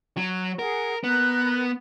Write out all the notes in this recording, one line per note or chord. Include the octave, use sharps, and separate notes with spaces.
F#3
G#4 A#4 F#5
B3 A#4 F#6